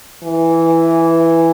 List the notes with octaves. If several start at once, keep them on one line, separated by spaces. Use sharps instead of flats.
E3